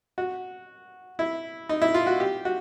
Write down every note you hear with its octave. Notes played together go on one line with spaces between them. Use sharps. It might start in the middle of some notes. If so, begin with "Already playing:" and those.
F#4
E4
D#4
E4
F4
F#4
G4
F#4